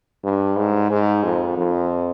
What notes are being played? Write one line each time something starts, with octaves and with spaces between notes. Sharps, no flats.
G2
G#2
G#2
F2
F2